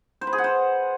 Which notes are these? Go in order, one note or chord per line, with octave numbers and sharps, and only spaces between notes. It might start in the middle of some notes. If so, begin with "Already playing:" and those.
C5
B4
G#4
F#5
C5